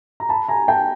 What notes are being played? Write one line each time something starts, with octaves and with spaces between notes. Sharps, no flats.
A#5
A5 B5
G#5 A#5
G5 A5